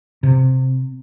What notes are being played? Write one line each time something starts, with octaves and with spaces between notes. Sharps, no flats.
C3